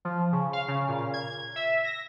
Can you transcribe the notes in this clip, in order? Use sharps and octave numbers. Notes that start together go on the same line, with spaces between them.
F3
C#3
F5
C#3
A#2
G#6
E5
A#6